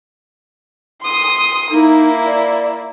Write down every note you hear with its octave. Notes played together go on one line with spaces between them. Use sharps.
C6 D#6
A#3 D#4 E4
D5